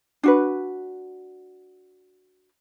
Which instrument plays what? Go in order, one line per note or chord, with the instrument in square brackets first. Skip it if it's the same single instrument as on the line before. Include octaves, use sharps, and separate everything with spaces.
[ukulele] D4 F#4 B4